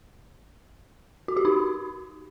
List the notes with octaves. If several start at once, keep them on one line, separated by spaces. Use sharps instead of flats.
F#4
G4
D#4